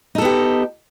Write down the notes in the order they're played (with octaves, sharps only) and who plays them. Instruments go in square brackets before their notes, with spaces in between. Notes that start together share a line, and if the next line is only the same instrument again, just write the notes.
[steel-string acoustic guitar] D#4
A4
B3
G4